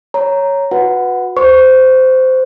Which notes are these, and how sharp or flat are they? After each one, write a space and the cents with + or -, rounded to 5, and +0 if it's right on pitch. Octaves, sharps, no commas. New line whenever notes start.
C#5 +0 A#5 +0
F#4 -30 B4 +0 F#5 +0
C5 -15 C#6 +10